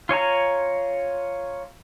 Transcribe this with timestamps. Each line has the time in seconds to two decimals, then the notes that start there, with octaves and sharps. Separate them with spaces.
0.09 F4 C#5 G#5 A#5